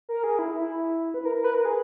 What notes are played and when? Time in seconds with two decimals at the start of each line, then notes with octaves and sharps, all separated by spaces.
0.09 A#4
0.24 G#4
0.39 E4
0.54 E4
1.14 B4
1.25 A#4
1.35 A#4
1.44 B4
1.55 A#4
1.65 G#4